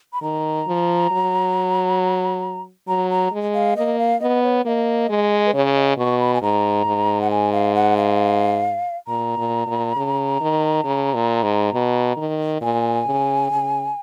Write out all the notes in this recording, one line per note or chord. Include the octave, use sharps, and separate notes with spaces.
B5
D#3 A#5
F3
F#3
F#3 A#5
A#5
G#3
F5
A#3 D#5
F5
B3 D#5
C#5
A#3 D#5 F5
G#3
B4
C#3 C#5
D#5
B2 C#6
B5
G#5
G#2 A#5
G#2
F#5
G#5
F5
F#5
F5
A#2 A#5
A#2
A#2
C#3
D#3
C#3
A#2
G#2
B2
D#3
A#2 G#5
C#3
C#3